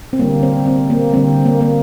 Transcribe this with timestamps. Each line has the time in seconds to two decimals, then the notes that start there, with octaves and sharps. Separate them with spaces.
0.13 C4
0.19 D3 G3 A#3
0.43 C4
0.67 C4
0.90 A#3
1.13 D3 G3 A#3 C4
1.46 A#3
1.61 A#3